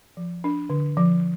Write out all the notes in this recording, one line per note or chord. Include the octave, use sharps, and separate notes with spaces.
F3
D4
D3
F3